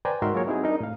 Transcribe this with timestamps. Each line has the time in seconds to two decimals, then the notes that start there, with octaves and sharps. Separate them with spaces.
0.05 B4 C5 D5 G5 G#5 A#5
0.22 G#2 D#4 F#4 A#4 E5 C6
0.34 F#3 A#3 F4 G#4 A#4 C#5
0.46 G3 C4 D#4 E4 F#4 G#4
0.64 D4 D#4 A#4
0.80 A2 F5